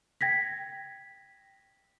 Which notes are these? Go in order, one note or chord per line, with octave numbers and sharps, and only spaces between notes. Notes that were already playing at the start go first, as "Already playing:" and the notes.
G5 G#6 A#6 B6